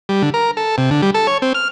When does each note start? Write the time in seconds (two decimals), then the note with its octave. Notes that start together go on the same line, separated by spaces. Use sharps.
0.09 G3
0.22 D3
0.34 A#4
0.57 A4
0.78 C3
0.91 D3
1.02 G3
1.15 A4
1.27 C#5
1.42 C4
1.55 F6